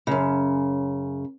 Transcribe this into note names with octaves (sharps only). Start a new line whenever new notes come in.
F#2 C#3